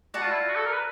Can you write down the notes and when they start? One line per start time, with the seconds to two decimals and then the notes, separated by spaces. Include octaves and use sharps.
0.14 F#4 D5 F#5 A5
0.22 F4
0.31 E4
0.40 F4
0.49 F#4
0.56 A4
0.65 A#4
0.73 B4